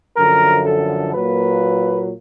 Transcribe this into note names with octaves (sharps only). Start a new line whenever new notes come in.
F#2 D3 F3 A#4
A4
A#2 F#3 A#3 B4